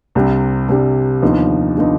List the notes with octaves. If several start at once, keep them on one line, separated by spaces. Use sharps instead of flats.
C2 C3 G3 D4
C2 C3 G3 D4
D#2 D3 F3 B3 D#4
D3 F3 B3 D#4